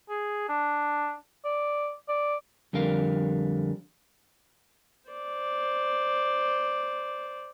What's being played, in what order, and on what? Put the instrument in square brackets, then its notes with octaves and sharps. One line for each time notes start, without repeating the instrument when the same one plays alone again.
[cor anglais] G#4
D4
D5
D5
[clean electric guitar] F2 D3 G3 A#4 F5
[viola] C5 D5